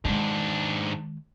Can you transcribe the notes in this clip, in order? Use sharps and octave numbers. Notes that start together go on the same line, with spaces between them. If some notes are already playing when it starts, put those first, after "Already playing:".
G#2 D#3 G#3 D4